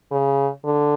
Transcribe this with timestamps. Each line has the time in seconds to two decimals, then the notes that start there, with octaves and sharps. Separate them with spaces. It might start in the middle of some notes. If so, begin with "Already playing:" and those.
0.12 C#3
0.64 D3